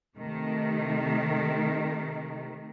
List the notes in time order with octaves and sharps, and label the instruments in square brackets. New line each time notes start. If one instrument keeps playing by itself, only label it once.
[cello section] C3 D#3 A3